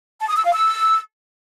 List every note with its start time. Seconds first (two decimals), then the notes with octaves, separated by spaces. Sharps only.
0.20 A5
0.28 D#6
0.37 E6
0.45 F5
0.53 E6